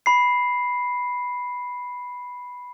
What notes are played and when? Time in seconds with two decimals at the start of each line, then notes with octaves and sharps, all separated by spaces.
0.06 B5 C7